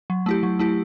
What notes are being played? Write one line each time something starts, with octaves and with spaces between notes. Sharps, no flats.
F#3
A3 E4 G4
F#3
A3 E4 G4